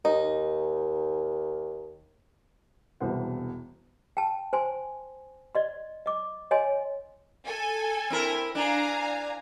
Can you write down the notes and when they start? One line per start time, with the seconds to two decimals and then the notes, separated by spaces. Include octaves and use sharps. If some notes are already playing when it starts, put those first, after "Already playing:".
0.05 D#2 D#4
3.00 E1 C2 B3 C5 F#5
4.17 G5 A5
4.53 C5 G#5 C6
5.55 D5 D#5 C6
6.06 D#5 D6
6.51 C#5 D#5 G#5 C6
7.46 A4 G#5
8.10 C4 E4 A#4
8.55 D4 F5 G#5 A#5